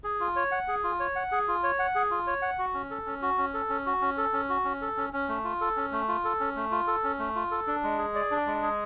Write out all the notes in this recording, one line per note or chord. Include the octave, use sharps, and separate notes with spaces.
G#4
F4
C#5
F#5
G#4
F4
C#5
F#5
G#4
F4
C#5
F#5
G#4
F4
C#5
F#5
F#4
C#4
A4
C#4
F#4
C#4
A4
C#4
F#4
C#4
A4
C#4
F#4
C#4
A4
C#4
C#4
A3
F4
A4
C#4
A3
F4
A4
C#4
A3
F4
A4
C#4
A3
F4
A4
D4
G#3
G#4
D5
D4
G#3
G#4